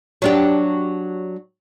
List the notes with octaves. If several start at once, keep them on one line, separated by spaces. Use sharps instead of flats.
F#3 D4 G4